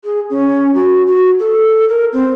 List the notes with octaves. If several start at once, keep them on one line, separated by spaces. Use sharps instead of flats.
G#4
C#4
F#4
F#4
A4
A#4
C4